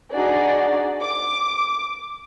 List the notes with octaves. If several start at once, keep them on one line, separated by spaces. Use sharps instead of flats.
D4 D#4 F#4 G#4 D5
D6